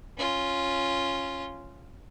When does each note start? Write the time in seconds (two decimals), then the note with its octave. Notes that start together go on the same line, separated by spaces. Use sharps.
0.18 C#4 F4